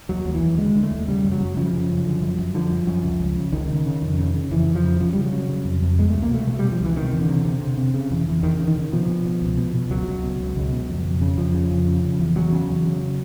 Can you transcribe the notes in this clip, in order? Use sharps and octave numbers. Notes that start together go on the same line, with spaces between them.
D#2 F#3
D#2
E3
D#2
D3 G#3
D3
A3
D#2
C#3 G3
F#2
F#3
F#2
C#3 F3
C#3
F#2
D3
F#2
F#2
D3 F3
F#2
F#2
C#2
C#2
C#3
C#2 D#3
C#3
C#3
F2
C#3
C#3
F2 E3
F2
F3
C#3
C#3 F3
C#3 G3
F#3
C#3
C#3
F2
F2
B2 G#3
C#2 A3
A#3
B2 A3
B2 A3
B2 G3
F3
C#2 E3
C3 D#3
E2
D3
C3
C3
C3
C3
C#3
E2
E2
E2 D#3
C#3
D#3
C#3
B2 F3
B2
B2
C#2
B2
B2
C#2 F#3
C#2
B2
C#2
C#2
B2
F2
F2
C#3
F2 F3
C#3
F2
C#3
C#3
E2
E2 F#3
C#3
E2
C#3